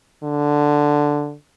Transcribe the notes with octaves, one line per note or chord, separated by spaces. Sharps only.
D3